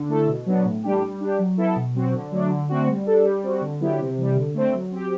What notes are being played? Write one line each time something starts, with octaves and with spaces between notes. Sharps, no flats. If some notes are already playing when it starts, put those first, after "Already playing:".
Already playing: D3
A3 E4 A4
B2
F#3 B3 D4
A2
E3 G3 D4 G4
G3
D4 G4
F#3
B3 E4 A4
B2
F#3 C4 F#4
D3
F#3 A3 D4
D3
A3 C4 F#4
G3
D4 A4
G3
C4 F#4
D3
F#3 B3 E4 G4
C3
E3 G3
D3
A3 C4
F#3
C4 G4